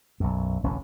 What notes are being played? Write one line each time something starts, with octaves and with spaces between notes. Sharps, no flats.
B1 F#2
E1 A1 D2 C#4